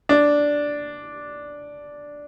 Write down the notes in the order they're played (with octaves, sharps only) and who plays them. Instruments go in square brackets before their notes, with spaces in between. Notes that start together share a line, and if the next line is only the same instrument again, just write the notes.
[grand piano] D4